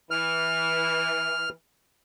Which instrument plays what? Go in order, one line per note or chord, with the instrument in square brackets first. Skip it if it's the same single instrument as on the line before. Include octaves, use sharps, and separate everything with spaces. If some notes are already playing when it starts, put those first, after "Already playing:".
[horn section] E3 [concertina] F6